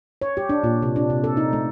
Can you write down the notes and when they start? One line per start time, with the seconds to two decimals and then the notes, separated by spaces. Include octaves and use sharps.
0.22 C#5
0.37 G4
0.49 D4
0.64 A#2
0.82 C3
0.96 D4
1.10 C3
1.24 A4
1.37 D#4
1.53 A3